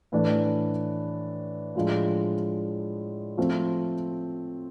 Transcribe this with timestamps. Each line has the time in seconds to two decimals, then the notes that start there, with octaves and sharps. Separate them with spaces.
0.12 A2 E3 A3 D4
1.75 A2 F3 G#3 D4
3.37 F3 A3 C4